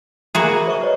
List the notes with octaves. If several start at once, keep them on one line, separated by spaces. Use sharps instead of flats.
A#3 F#4 G#4 E5 B5
C5 E5 C#6
B4 C#5 D#5